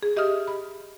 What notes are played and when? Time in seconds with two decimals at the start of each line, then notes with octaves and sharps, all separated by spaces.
0.03 G#4
0.17 G4 D#5 E5 D#6 F6
0.48 B5